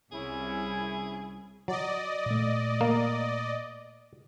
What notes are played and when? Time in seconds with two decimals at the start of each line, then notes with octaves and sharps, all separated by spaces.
0.12 C2 C#4 E4 G#4
1.68 F#3 D5 D#5
2.26 A#2 A3
2.81 A#3